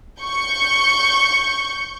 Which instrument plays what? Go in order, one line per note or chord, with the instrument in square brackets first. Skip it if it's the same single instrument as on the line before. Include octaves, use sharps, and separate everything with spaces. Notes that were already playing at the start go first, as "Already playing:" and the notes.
[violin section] C#6 G6